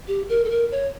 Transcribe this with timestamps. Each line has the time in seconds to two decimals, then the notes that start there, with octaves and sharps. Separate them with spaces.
0.08 G4
0.29 A#4
0.45 A4
0.50 A#4
0.72 C#5